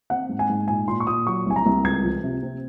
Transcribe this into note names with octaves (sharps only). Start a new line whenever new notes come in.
C4 F#5
G#2
G#5
G#2
A#2 G#5
A#2 C6
C#6
A#2 D#6
F#3 C#6
C2 G#5
A#5
C2
C#2 G#6
F3
C3
C4